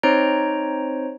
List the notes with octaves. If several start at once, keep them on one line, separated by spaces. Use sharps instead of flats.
C4 D#4 C5 C#5 A#5 D7